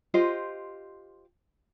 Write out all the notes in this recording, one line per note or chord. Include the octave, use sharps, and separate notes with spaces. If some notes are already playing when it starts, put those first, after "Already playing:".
F4 G4 C5 D#5